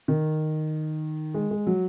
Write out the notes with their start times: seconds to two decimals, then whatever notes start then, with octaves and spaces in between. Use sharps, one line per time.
0.08 D#3
1.34 G#3
1.51 G#3
1.67 F#3